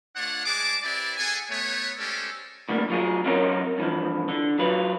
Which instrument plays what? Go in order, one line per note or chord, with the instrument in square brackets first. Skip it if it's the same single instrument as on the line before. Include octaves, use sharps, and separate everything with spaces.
[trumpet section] A3 D4 F4 C#5 F#5
G#3 G#4 D5 A5 D6
C4 E4 G4 B4 D5
G#4 A4 F#5 G#5
A3 B3 C#5
G#3 C#4 G4 A4 C5 D5
[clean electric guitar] A2 D3 G3 A#3
F#3 F4 G#4
F#3 C4 C#4 D#4 A#4 C#5
G2 E3 F3
D3
F#3 F4 B4